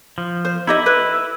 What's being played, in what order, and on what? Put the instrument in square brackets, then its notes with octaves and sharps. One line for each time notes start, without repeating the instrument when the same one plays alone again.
[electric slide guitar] F3
[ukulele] C5
[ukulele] D#4 G4 D#5 [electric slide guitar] E4
[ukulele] B4